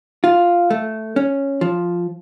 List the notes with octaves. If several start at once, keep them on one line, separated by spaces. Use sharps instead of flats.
F4
A3
C#4
F3